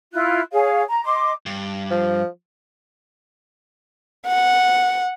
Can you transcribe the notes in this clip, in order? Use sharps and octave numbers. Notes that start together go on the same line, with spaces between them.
E4 F4 F#6
G#4 C#5 F5
A#5
D#5 C6 D6
G2
F3
F#5